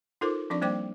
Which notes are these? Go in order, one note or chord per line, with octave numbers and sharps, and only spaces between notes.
D#4 F4 A4 A#4 C5 D6
F3 C4 D4 D5 C#6 D6
G3 A#3 C5 D5 G5 D6